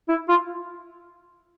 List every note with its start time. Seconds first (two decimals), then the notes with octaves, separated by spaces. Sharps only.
0.09 E4
0.28 F4